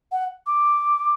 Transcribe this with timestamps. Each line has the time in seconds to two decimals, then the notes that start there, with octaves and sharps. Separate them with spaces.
0.12 F#5
0.47 D6